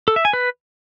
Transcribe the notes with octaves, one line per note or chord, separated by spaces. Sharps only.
A4
E5
G#5
B4